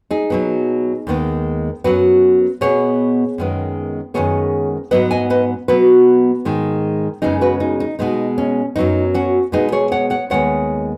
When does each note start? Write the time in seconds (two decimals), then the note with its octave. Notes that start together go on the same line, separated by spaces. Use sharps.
0.11 D#4 G#4
0.30 B2 F#3 B3
1.07 D#2 D#3 G#3 B3
1.84 F#2 F#3 B3 F#4 B4
2.61 B2 B3 G#4 C#5
3.38 F#2 D#3 G#3 B3
4.14 F#2 D#3 G#3 B3 G#4 C#5
4.91 G#2 F#3 B3 B4 D#5
5.11 D#5 G#5
5.30 B4 D#5
5.68 B2 F#3 B3 F#4 B4
6.45 G#2 D#3 G#3
7.22 F#2 C#3 G#3 B3 D#4 G#4
7.41 F#4 B4
7.60 D#4
7.80 D#4
7.99 B2 G#3 B3 D#4
8.38 C#4
8.76 F#2 F#3 B3 D#4
9.14 C#4 F#4
9.52 B2 G#3 B3 D#4 G#4
9.72 G#4 C#5
9.92 C#5 F#5
10.10 C#5 F#5
10.30 D#2 D#3 G#3 B3 C#5 F#5